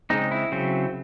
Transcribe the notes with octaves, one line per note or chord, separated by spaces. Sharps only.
C#3 G#3 C4 D#4
E4
C#3 F#3 C4